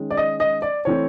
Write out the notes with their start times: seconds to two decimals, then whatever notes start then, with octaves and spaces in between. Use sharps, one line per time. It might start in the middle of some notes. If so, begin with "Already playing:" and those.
Already playing: D#3 G#3 C#4
0.11 D5
0.17 D#5
0.40 D#5
0.62 D5
0.85 E3 A3 C4 C#5